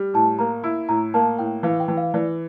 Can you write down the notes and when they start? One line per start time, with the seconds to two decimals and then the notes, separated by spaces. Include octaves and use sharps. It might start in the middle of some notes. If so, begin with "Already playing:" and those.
Already playing: G3
0.14 A2 A5
0.39 A#3 A#5
0.64 E4
0.89 A2 A#5
1.14 A#3 A5
1.39 A2 G5
1.63 E3 F5
1.80 G5
1.88 E3
1.97 F5
2.14 E3 D5